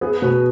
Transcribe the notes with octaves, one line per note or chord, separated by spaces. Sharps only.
B3 G#4
B2 B4